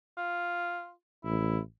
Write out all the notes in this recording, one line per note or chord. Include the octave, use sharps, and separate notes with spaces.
F4
A1 E4